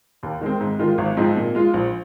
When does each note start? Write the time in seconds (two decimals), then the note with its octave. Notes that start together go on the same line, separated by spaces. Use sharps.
0.23 D#2
0.41 D#3 G#3 C4
0.60 G#2
0.79 D#3 G#3 F4
0.98 G#1
1.17 G#2 F3 C4 D#4
1.36 A#2
1.55 G#3 F4
1.74 A#1